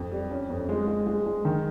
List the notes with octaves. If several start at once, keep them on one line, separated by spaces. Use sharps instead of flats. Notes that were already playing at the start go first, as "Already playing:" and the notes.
Already playing: F2
G3
C#4
F2
G#3
G#3
G#3
G#3
D#3